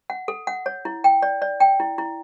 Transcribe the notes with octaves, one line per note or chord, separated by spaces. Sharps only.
F#5
A4
F#5
C#5
E4
G5
D5
D5
G5
E4
E4